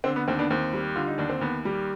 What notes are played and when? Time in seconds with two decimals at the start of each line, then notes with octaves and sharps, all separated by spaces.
0.04 D3 C4
0.16 B3
0.28 D#2 C4
0.39 B3 D4
0.51 D#2 C4
0.73 G3
0.95 D3 F4
1.07 D#4
1.18 D#2 D4
1.29 C4
1.41 D#2 B3
1.65 G3